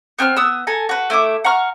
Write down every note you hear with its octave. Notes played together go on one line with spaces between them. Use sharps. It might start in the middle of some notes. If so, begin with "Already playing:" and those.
B3 C4 D6 F6
B3 D#6 E6
A4 G#5 A#5
F#4 B4
A3 E4 E5 D6
F#5 A#5 C#6 F6